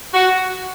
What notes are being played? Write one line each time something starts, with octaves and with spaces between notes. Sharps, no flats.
F#4